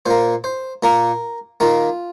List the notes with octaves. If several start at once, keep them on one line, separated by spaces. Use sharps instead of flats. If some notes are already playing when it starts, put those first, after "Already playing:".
A#2 A#3 C5
C5
A#2 A#3 A#4
D#3 A#3 F4